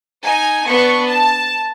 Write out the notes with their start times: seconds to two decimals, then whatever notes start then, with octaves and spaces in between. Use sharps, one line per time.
0.25 D#4 G#5
0.67 B3 D4 C#6
1.08 A5